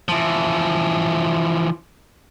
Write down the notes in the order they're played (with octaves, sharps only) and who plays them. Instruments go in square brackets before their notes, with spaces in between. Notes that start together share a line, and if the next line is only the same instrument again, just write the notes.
[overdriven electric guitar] E3 F3